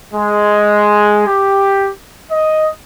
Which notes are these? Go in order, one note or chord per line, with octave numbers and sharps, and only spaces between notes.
G#3
G4
D#5